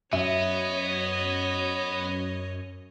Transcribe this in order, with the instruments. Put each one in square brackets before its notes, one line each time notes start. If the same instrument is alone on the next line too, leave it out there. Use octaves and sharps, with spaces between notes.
[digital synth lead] F#2 [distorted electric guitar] B3 [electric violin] C#5 D#5 [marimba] E5